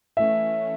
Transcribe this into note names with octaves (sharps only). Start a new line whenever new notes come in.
E3 A3 C#4 E5